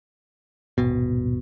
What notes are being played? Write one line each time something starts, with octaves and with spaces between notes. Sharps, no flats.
D#1 G#1 B2